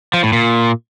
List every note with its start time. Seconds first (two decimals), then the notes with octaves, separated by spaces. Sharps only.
0.14 F3
0.23 A2
0.33 A#2